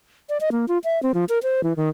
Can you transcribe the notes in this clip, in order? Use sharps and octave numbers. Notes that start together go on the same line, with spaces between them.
D5
D#5
A#3
F4
E5
C4
F3
A#4
C5
E3
D#3